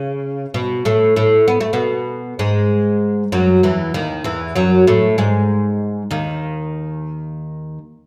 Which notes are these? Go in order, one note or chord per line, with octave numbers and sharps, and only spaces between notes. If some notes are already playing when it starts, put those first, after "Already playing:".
Already playing: C#3
B2
A2 A3
A2 A3
B3
A3
B2 B3
G#2 G#3
F#2 F#3
E2 E3
D#2 D#3
E2 E3
F#2 F#3
A2 A3
G#2 G#3
D#2 D#3